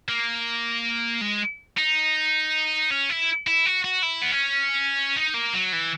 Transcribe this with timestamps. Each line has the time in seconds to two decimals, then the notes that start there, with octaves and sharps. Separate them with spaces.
0.09 A#3
1.21 G#3
1.78 D#4
2.91 C#4
3.09 E4
3.47 E4
3.66 F#4
3.84 F#4
4.03 E4
4.22 B3
4.31 C#4
5.17 D#4
5.34 A#3
5.54 F#3
5.73 E3